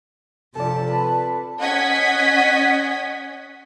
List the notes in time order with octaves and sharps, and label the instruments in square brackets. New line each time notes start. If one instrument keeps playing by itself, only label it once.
[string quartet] C3 F3 A5 [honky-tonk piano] A4 D5
[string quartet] B4 [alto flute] A5
[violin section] C#4 D#5 F#5 G#6 B6